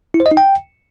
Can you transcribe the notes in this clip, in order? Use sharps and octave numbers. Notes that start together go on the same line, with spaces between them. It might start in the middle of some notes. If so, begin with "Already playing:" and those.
E4
C5
D#5
D#4
G5